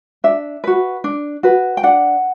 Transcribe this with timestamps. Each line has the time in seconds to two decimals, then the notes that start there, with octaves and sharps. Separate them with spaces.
0.24 D4 E5
0.64 F#4 B4
1.04 D4
1.43 F#4 B4
1.77 G5
1.83 D4 F#5